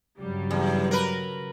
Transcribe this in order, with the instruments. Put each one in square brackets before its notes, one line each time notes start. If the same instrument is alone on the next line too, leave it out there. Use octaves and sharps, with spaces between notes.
[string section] G2 G3 [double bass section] C#3 F#3
[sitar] E2
A#4 B4